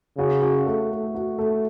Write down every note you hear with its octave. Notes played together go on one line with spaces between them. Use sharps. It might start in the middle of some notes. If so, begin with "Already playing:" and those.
C#3 F#4
F#4
A3
A3
F#4
A3